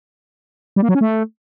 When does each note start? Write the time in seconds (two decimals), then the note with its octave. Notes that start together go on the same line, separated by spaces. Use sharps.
0.76 G3
0.82 A#3
0.89 F#3
0.95 C#4
1.01 A3